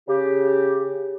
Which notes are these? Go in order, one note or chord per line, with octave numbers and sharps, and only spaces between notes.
C#3 G4